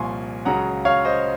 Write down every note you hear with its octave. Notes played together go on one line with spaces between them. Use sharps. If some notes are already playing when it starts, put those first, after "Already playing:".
Already playing: C2 A#2 F3 G#5 C6 C#6
C#2 C#3 F#3 F#5 A#5
C#5 F5
C5 D#5